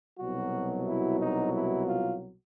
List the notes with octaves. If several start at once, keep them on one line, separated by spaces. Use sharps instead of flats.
C2 B2 F#3 F#4
E4
D#4
E4
F4